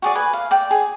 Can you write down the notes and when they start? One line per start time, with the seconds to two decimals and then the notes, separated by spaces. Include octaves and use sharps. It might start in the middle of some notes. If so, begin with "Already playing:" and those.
0.02 F#4 G#4 D5
0.15 B4 G#5
0.33 F5
0.51 D5 G5
0.71 G#4